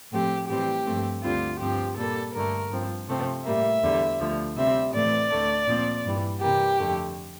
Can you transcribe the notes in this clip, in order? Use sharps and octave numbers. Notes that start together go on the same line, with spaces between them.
A2 F3 A3 C4 G4
A2 E3 G3 C4 G4
G2 F3 A3 C4
D2 D3 G3 C4 F4
G2 F3 C4 G4
A#2 G3 A#3 A4
G2 D3 A3 A#4
G2 F3 C4
C3 F3 A3 C4
A2 G3 A#3 E5
E2 D3 G3
D2 D3 F3
C3 G3 C4 E5
A2 E3 A3 C4 D5
D2 D3 A3
A#2 F3 C4
G2 E3 G3
C3 E3 G3 A#3 G4
F2 D3 A3